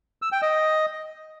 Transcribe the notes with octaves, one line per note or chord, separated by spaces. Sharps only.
E6
G5
D#5